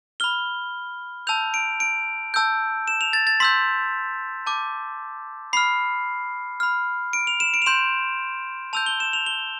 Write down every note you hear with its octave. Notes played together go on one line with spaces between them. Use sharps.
B5 F6 G7
A5 E6 G6 F7
D7
D7
A5 E6 G6
E7
F7
A6
A6
C6 E6 G6 B6
A5 D6 G6
B5 F6 C7
B5 F6
D7
F7
E7
D7
F7
C6 G6 E7
A5 E6 G6 F7
G7
E7
F7
G7